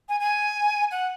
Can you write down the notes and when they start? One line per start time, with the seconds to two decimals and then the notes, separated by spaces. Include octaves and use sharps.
0.09 G#5
0.20 G#5
0.91 F#5